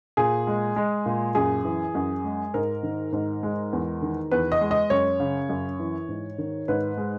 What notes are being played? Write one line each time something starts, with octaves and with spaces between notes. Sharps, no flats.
A#2 G#4
G#3
G#3
A#2
F#2 G#4
E3
F#2
G#3
G#2 A#4
D#3
G#2
G#3
E2
D#3
E2 B4
D#5
G#3
D#5
F#2 C#5
C#3
F#2
E3
G#2
D#3
G#2 B4
G#3